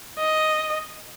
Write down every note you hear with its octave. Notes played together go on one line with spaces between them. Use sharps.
D#5